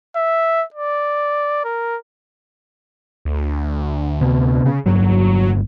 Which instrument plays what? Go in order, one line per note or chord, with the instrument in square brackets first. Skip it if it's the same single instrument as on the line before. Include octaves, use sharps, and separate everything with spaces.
[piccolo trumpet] E5
D5
A#4
[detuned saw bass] D2
[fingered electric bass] C3 B3
[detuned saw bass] C#3
[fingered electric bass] G1 G2 A#3 [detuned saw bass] F#3